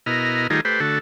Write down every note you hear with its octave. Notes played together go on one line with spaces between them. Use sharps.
B2 E4 A#4 D#5 F6
D#3 G3 A3 D#4 F4 G#4
A3 G4 B4 C5
D3 A3 F#4 A4